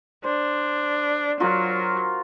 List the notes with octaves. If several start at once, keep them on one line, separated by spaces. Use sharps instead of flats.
D4 C5
F#3 F4 F#4 A#4